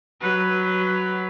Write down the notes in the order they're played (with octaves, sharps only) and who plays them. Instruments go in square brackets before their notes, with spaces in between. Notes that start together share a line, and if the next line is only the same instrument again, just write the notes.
[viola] F#3 B4